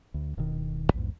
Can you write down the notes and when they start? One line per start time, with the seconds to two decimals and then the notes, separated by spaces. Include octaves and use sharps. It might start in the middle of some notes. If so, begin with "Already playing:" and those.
0.14 D2
0.37 D1 B2 D#3
0.94 A#1 E2 G#2